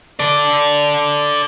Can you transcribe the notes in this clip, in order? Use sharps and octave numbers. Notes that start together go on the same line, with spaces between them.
A4 D5